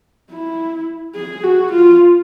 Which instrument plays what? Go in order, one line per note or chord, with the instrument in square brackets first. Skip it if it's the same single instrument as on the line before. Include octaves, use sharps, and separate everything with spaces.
[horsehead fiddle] E4
G#4
F#4
F4